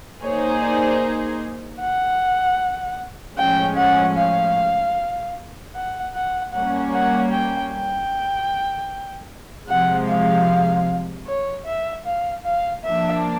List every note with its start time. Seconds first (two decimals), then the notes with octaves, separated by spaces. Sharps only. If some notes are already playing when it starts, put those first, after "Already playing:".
0.22 A#3 D#4 G#4 C5 C#5
0.62 D5
1.81 F#5
3.38 A2 F3 G#3 C#4 G5
3.78 F#5
4.17 F5
5.75 F#5
6.15 F#5
6.53 G3 A#3 C#4 F#5
6.93 F#5
7.32 G5
7.72 G5
9.69 C3 F3 G#3 F#5
10.08 F5
11.27 C#5
11.66 E5
12.06 F5
12.45 F5
12.84 F3 A#3 D4 E5